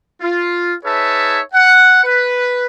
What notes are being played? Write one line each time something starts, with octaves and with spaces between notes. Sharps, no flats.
F4
D#4 G#4 B4 C#5 E5 A5
F#5
B4